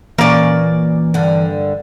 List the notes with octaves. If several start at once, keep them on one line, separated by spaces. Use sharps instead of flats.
A#2 E3 A#3 C#4 D5
G2 D3